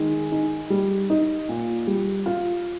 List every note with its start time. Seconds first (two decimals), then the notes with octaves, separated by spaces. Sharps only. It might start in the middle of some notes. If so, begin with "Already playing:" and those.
Already playing: D#3 G#3
0.32 D#4
0.70 G3
1.10 D#4
1.49 A#2
1.87 G3
2.26 F4